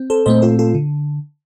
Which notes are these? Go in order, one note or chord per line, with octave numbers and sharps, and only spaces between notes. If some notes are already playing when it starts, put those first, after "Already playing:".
Already playing: C4
A4 C5
A#2 A3 C4 C5 D#5
F4 A4
F4 A4
D3